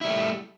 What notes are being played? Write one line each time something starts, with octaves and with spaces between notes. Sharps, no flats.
G3 A3 E4